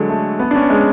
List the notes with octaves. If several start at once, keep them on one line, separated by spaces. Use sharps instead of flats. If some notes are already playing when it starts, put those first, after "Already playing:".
Already playing: D3 F#3 G#3
A3
B3
D4
C#4
G#3